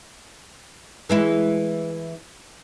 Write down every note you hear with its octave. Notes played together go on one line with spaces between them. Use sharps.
E3 G#3 E4